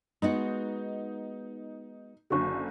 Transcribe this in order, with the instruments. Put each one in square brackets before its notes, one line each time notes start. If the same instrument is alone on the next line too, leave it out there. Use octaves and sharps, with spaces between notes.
[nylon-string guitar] G#3 B3 F#4 [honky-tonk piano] D#4
[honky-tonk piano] F#1 D3 [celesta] F#4 C#6